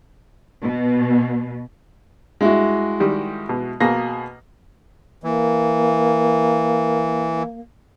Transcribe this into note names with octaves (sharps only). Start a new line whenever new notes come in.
B2
G2 G#3 E4 F#4
D#3 G3
B2
B2 A#3 G#4 A#6
E3 A#3